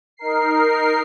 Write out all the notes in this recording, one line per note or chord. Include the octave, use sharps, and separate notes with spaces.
D#4 A#4 C7